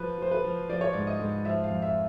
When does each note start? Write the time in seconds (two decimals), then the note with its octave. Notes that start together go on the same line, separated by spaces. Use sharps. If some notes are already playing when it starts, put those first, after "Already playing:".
Already playing: F3 B4
0.18 F3 C5
0.31 B4
0.44 F3
0.69 F3 D5
0.81 C#5
0.93 G#2 D5
1.07 D#5
1.19 G#2
1.45 F3 E5
1.64 F5
1.70 F2
1.82 E5